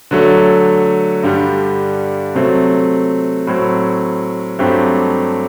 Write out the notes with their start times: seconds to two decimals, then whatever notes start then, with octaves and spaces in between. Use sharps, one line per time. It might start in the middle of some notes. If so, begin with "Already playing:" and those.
0.11 D3 F#3 A3
1.23 G2 D3 G3
2.35 C3 F#3 A3 C4
3.47 A2 F#3 C4
4.59 G2 F#3 A3 C4 G4